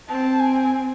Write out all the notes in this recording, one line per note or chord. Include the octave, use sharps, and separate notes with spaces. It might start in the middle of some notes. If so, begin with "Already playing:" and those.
C4 A5
G#5